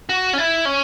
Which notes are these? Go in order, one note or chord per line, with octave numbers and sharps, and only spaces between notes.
F#4
C#4
E4
C#4